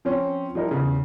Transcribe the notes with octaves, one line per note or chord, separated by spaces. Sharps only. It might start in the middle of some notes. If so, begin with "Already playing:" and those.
F3 C4 C#4 C#5
F3 G3 D#4 E4 A#4
E2 C#3